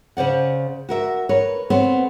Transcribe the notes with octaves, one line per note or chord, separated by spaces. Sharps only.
C#3 C5 D5 F#5
F#4 A#4 E5
A#4 B4 C#5
B3 C4 A4 C#5